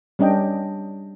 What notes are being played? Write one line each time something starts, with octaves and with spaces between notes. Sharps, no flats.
G3 C#4 D4 D#5 G5